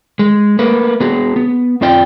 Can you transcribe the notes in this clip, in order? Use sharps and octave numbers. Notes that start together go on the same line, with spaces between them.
G#3
A3 A#3 B4
B3 F#4 G#4
B3
F2 C4 F4 D5 G5